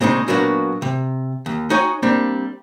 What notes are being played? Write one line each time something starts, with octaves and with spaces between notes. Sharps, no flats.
A#2 C#3 G#3 C4 C#4 D#4
A#2 F#3 A#3 B3 D4 F#4
C3
D#2
D#4 F#4 C#5 G5 G#5
G3 A#3 C4 D4